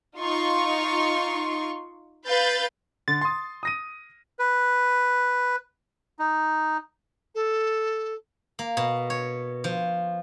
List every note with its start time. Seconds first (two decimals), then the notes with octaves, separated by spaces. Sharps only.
0.17 D#4 F4 C6 C#6
2.26 B4 F5 G6 A6
3.08 D3 A6
3.21 C6 D#6
3.63 D#6 A#6 D#7
4.39 B4
6.19 D#4
7.35 A4
8.59 A#3
8.77 B2
9.10 C#5
9.64 F3